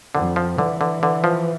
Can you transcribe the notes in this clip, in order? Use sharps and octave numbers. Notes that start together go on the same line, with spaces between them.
F2 D3
F3
D3 E3
D3
D3
F3